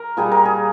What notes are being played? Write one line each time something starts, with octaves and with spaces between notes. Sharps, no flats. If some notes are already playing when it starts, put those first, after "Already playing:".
Already playing: A#4
A#2 G3 A#3 G#4
A#4
G#4